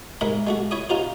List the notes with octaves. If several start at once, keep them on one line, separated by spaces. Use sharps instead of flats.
G#2 G#3 A#4 E5 B5
G#3 A3 F#4
E4 C#5 E5 D#6
C#4 D#4 F4 F#4 C5